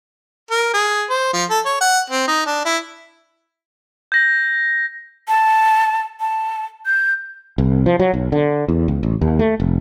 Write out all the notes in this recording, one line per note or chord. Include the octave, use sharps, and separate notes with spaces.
A#4
G#4
C5
F3
A4
C#5
F#5
C4
D#4
D4
E4
G6 A#6
A5
A5
G6
C2
F3
F#3
B1
D3
E2
C#2
A1
D#2
A3
F1